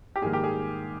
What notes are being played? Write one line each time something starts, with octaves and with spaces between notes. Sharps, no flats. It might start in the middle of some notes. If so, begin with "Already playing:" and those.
G4
G#2 D#3 G3 A#3 G#4
G4
G#4